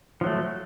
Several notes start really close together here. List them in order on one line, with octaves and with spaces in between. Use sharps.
F3 F#3 A3